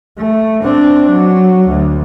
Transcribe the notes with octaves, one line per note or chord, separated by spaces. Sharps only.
A3
C4 D4
F#3
D2